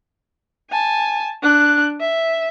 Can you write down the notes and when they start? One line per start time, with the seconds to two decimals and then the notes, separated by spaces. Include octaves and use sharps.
0.70 G#5 A5
1.42 D4 F#6
2.00 E5